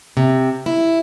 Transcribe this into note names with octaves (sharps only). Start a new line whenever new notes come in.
C3
E4